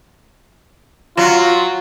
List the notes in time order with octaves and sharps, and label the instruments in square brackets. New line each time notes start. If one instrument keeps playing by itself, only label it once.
[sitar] F#3 [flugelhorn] F4